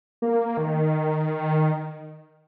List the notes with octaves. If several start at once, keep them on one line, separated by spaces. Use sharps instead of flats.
A#3
D#3